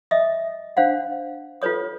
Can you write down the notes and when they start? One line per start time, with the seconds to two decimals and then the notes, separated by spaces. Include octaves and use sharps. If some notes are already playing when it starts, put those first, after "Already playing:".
0.11 D#5 E5 D#6
0.77 D4 C5 F5 F#5
1.62 F4 A4 B4 C#5 D#6